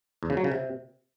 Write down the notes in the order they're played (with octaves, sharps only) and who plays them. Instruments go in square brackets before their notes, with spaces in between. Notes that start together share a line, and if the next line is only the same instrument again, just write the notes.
[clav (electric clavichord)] E2
C#3
F#3
C#3
C3